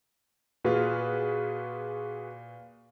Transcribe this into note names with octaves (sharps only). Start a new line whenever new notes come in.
A#2 F4 F#4 G#4 B4